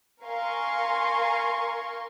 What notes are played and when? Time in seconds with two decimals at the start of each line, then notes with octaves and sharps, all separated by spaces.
0.22 A#4 F5 G#5 C6 C#6